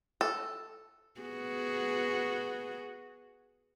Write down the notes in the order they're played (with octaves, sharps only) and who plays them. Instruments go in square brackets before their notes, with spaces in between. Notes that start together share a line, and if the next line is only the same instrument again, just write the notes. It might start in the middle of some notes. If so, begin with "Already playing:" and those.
[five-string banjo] A4
[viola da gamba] B3 F#4 G#4